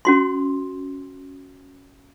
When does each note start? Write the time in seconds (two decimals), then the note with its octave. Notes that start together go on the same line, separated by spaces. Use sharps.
0.05 C#4 F#4 C6